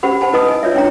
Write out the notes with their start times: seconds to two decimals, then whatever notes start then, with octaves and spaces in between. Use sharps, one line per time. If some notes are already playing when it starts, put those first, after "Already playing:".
0.03 C#4 G4 C5 F#5 B5
0.21 C5 F#5 A5 B5
0.33 D#4 E4 B4 D#5 A5 D#6
0.48 D#5 G#5
0.63 F4 C#5 D5 E5
0.75 C#4 D4 E4 C#5 G5 A#5